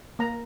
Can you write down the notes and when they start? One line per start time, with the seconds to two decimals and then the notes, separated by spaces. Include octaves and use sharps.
0.19 A#3 A#5